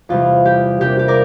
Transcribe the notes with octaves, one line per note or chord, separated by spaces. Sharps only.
E2 C3 G3 F4
G4
C3 G3 A#3 D4 G4
G4
A#4 D5